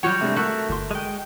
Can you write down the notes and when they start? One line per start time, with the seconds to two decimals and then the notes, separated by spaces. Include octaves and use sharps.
0.03 F#3 G3 F4 F#4 C#5 F#5
0.21 C3 G#3 A3 D4
0.36 F#4 A4 A#4 E5
0.69 G1 C6
0.91 G#3 G5